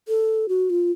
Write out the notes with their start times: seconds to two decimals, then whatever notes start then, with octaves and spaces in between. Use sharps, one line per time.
0.08 A4
0.49 F#4
0.70 F4